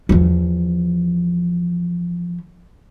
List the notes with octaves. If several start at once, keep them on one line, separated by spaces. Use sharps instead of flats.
E2 F3